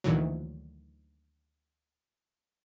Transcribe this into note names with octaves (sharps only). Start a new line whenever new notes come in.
D2 A#2 D#3 E3 F#3